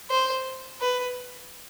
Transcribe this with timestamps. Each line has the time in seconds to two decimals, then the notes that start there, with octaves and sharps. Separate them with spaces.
0.10 C5
0.81 B4